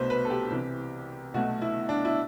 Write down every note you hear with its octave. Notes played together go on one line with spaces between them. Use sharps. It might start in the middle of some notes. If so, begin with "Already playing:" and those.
Already playing: C2 B2 A3 B4 C5
B4
A4
G4
C2 C3 E3
B1 B2 F#3 A3 F#4
E4
D4
E4